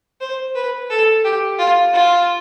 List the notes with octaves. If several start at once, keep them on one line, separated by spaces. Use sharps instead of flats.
C5
B4
A4
G4
F4
F4